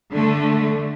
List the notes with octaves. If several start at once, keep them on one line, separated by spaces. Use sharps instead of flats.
D3 A3